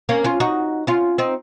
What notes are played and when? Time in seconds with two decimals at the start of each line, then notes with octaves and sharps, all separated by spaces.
0.09 A#3 C#4
0.24 C#4 F4
0.40 D#4 F#4
0.87 C#4 F4
1.18 C4 D#4